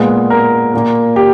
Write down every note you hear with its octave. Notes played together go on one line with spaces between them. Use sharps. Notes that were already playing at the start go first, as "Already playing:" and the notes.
Already playing: A#2 G#3 B3
A#4
A#2 A#3
G4